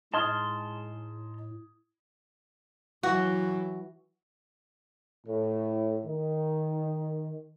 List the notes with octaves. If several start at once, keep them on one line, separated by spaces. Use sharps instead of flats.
A2 G#3 D#4 A5 C6 D#6 F6 G#6
E3 F#3 F#4
A2
D#3